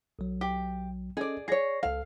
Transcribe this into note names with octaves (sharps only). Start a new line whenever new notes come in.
B1 F#3
G4
C#4 G#4 A4 D5 D#5
G#4 C#5 D5 A#6 C7
C#2 A4 F5